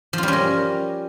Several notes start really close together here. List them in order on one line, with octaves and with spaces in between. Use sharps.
F3 F4 G3 C#4 A#4